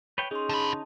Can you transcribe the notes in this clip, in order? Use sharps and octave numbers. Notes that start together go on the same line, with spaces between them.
B4 C#5 G5
C#4 D#4 G#4 C6
D3 B4 A5